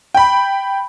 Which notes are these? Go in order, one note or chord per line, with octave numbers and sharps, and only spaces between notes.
G5 B5